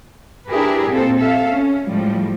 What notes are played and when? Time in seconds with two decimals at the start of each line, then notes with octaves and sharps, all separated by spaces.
0.48 D4 E4 G4 G#4 A#4 B4
0.89 A#2 C4 A4 C5
1.19 A4 E5 F5
1.51 C#4
1.87 A2 F3 G3 G#3